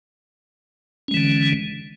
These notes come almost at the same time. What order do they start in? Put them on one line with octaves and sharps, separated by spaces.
C#4 G#3 E3 D3